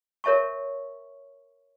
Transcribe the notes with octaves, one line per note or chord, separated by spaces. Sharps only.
A#4 C#5 E5 A5 C#6